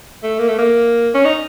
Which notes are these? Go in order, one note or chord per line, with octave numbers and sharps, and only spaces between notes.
A3
A#3
A3
A#3
C#4
D#4